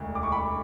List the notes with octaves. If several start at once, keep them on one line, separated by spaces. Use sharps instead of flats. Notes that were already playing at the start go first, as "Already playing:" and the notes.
Already playing: E1 D2
D6
C#6
B5